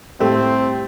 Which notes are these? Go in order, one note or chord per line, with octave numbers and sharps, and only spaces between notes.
A2 G3 A3 C4 G4